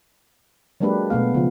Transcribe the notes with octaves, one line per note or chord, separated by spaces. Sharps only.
F#3 G#3 A#3 D4 G4 B4
B2 A3 B3 F5
C#3 F3